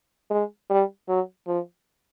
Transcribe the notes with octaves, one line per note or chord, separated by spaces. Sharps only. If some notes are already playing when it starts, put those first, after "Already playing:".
G#3
G3
F#3
F3